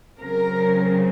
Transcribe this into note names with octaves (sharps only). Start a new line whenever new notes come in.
C#3 F#3 C4 A#4